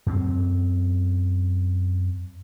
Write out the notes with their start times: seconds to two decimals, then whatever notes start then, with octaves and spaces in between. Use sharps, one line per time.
0.06 F#2 C4